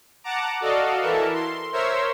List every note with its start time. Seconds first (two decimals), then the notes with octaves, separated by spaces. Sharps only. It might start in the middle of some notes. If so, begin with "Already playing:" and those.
0.24 F#5 A5 A#5 D6
0.61 F#4 A4 D5 D#5 F5
1.02 E3 A4 A#4 E5 A5
1.34 C6
1.73 A#4 C5 C#5 E5 C6 E6